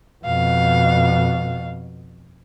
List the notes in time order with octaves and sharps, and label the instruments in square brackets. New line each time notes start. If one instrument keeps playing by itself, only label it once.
[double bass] F2 B2 [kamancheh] F5